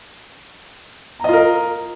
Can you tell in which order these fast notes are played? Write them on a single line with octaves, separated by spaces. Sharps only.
A#5 D#5 F4 A#4